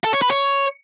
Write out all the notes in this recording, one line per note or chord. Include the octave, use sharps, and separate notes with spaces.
A4
C#5
B4
C#5